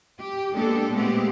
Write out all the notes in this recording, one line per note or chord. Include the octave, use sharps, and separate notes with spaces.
G4
G#3 A#3 B3 D4 G4 A4
A#2 G#3 A3 B3 C4 G4